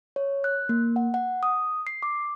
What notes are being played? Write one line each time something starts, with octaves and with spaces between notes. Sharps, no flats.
C#5
F#6
A#3
F#5
F#5
D#6
C7
D6